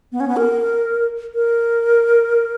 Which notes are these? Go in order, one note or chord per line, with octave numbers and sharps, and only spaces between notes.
B3
C#4
B3
A#4
A#4